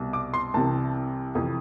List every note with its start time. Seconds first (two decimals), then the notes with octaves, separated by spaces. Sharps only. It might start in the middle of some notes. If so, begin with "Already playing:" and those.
Already playing: C2 B2
0.13 D6
0.34 C6
0.54 C2 C3 E3 A5
1.35 F2 C3 E3